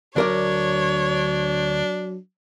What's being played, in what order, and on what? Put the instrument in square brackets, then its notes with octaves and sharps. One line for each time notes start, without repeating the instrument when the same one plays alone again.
[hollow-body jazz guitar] D2 A#4 D5 [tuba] F#3 [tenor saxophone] D4 [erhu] C#5